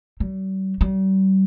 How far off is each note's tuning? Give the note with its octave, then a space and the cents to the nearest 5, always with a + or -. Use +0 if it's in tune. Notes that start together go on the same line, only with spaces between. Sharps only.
G3 -45
G3 -40